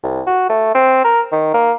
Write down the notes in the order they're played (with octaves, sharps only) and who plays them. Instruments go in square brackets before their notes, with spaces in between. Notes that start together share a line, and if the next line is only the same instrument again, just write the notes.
[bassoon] C2
F#4
A3
C4
A#4
D#3
A#3